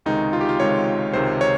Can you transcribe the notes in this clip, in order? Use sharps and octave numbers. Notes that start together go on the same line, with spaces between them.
C#2 C3 D#3 G#3 D#4
F4
G4
F4
C#2 C3 D#3 G#3 C#5
C#2 C3 D#3 G#3 C5
C#5